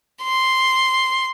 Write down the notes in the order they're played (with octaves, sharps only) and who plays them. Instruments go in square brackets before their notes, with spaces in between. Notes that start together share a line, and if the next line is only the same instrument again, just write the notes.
[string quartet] C6